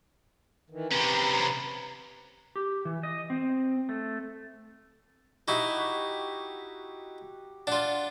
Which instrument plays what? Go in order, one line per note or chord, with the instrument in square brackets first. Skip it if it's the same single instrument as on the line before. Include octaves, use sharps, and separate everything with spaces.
[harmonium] D#3 E3
[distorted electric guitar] C3 C#4 [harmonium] B4 A#5
[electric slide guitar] G4
E3
D#5
C4
A3
[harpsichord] D#4 E4 [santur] F#4 G4
[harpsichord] D4 F4 [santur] F#5